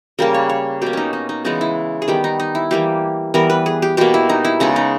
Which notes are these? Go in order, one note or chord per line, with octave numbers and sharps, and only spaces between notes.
C#3 G3 A#3 A#4
C#5
C#5
B2 A#3 G4
C#4 D#4
D#4
D#4
C#3 E3 G#3 B3 D#4
E4
G#4
D#3 G3 B3 G4
D#4
D#4
E4
E3 G3 A#3 G4
E3 G3 B3 A#4
B4
G#4
G4
B2 A#3 G4
E4
D#4
E4
C#3 G#3 B3 D#4
D#4